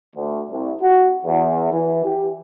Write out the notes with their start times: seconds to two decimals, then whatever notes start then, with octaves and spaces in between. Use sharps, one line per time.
0.16 D2
0.51 C2
0.81 F#4
1.25 E2
1.73 E3
2.05 G4